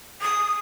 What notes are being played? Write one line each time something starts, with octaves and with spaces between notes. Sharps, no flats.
D#6